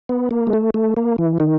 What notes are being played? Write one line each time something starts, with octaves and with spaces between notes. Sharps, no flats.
B3
A#3
G#3
A3
A3
A#3
E3
D#3